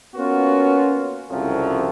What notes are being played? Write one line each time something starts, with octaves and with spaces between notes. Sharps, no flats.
A#3 B3 C#4 F4 F#4
C2 F2 C#3 F3 F#3